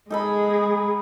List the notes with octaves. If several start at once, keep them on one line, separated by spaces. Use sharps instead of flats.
G#3 D#4 G#4 A4 B5